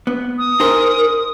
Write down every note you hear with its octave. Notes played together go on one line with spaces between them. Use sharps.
B3
D#6
D#4 G#4 A#4 C5